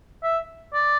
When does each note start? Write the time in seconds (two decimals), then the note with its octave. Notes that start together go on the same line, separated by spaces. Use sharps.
0.23 E5
0.73 D5